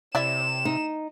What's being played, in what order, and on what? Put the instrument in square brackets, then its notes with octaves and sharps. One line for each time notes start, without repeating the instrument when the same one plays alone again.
[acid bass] C3 [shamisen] E4 D5 E5 [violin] E7
[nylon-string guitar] D#4